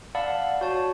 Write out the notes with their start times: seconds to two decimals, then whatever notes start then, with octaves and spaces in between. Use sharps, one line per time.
0.15 D5 F5 F#5 A5 B5 E6
0.61 F#4 C#5 A5